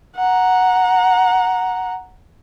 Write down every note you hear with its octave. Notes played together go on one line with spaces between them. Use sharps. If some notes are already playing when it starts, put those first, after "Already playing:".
F#5 A#5